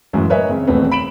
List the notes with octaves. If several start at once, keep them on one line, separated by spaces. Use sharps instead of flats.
F#2 A2 C#3 E3 G#3
A#4 B4 C#5 D#5 E5 G#5
C#3 C4
D#1 E2 A3 B3 C4 B4
B5 D7 E7 F#7